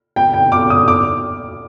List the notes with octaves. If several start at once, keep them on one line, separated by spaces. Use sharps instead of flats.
G5
G5
D6
D#6
D6